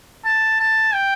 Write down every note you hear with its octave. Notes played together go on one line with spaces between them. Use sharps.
A5
A5
G5